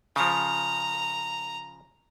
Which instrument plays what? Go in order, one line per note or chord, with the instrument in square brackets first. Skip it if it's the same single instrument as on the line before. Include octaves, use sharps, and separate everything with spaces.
[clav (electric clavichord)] C#3 F3 [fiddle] A#5